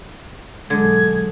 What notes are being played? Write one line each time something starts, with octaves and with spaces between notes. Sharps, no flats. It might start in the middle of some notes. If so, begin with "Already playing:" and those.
B1 D3 F#3 G#3 G#6